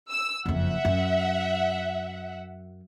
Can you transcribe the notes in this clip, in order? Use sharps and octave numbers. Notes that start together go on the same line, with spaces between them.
E6
F#1 F2 E5 F#5
F#2